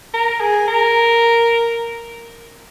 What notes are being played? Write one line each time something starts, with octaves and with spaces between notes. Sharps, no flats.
A#4
G#4
A#4